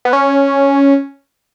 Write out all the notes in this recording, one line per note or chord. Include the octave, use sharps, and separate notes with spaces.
B3
C#4